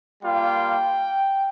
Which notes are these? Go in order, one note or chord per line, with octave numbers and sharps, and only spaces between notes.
G3 A#3 F4 G5